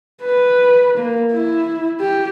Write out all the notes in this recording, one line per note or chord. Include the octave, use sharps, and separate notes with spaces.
B4
A#3
E4
G4